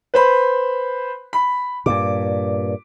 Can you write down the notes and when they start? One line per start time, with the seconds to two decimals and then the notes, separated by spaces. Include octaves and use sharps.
0.14 B4 C5 B5
1.33 B5
1.86 G2 A#2 D6